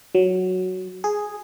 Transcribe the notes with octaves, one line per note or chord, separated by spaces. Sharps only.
F#3
G#4